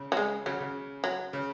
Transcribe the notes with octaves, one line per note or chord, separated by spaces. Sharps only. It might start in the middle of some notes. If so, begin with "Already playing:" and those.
Already playing: C#3
F#3
G#3
C#3 F#3
C#3
F#3
C#3